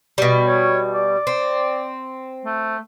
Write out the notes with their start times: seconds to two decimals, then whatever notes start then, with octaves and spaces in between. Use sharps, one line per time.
0.18 B2 G3
0.47 C#5
0.94 D5
1.27 C4
2.45 A3